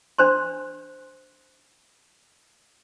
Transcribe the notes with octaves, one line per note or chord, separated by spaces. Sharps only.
D4 C5 C6